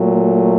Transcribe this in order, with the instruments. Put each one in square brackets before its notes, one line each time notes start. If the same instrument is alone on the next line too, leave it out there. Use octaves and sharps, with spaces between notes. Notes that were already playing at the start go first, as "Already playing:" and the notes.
Already playing: [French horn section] A#2 F#3 A3